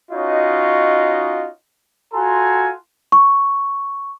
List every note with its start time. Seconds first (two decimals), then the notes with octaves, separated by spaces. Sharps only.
0.11 C#4 D#4 F4 F#4 C#5 D#5
2.14 F4 F#4 A4 G#5 A#5 C6
3.12 C#6